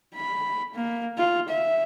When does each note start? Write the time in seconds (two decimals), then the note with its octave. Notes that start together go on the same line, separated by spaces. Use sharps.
0.15 B5
0.74 A#3
1.18 F4
1.49 E5